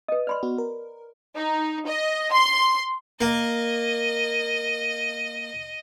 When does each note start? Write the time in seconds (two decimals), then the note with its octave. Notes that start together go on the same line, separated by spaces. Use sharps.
0.08 B4 D#5 D#6
0.27 D5 B5 C6 F6
0.43 B3 F#4
0.58 A#4
1.36 D#4
1.87 D#5
2.33 C6
3.21 A#3 D#5